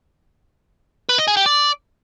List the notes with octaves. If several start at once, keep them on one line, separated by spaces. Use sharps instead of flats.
B4
D#5
G#4
G4
D5